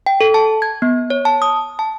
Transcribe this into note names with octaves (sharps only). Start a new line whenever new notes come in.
G5
A4
A5
G#6
B3
C#5
A5
D#6
A5